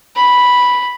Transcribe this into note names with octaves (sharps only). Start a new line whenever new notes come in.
B5